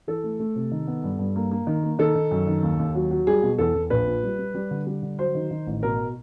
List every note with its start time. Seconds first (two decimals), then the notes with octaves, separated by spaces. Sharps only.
0.07 E3 A4
0.24 A3
0.39 A3
0.56 C3
0.72 D#3
0.88 B3
1.04 G2
1.19 G2
1.36 A#3
1.51 A#3
1.67 D#3
1.83 A#3
1.99 D#3 A4
2.15 D#3
2.31 F#2
2.47 D#3
2.63 D#2
2.79 D#2
2.95 F#3
3.11 F#3
3.27 G3 G#4
3.43 B2
3.59 E2 A4
3.75 E2
3.90 A#1 B4
4.06 A#2
4.23 G3
4.39 G3
4.55 G3
4.71 D3
4.87 G3
5.03 D3
5.19 F#3 C5
5.35 D#3
5.51 D#3
5.67 A1
5.83 B2 A#4